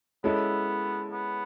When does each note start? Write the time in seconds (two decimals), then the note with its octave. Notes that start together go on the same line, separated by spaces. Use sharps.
0.24 G#3 B3 C#4 E4 A4
1.12 B3